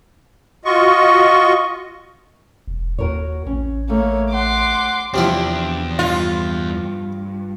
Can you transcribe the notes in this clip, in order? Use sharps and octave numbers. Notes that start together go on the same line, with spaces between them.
F4 F#4 D#5 C#6
E1
D#2 F#4 A#4 C#5
A1 C#4
A3 A#3 C#5
F#5 C6 D6
E2 C3 F3 D4 E4
C2 G2 F4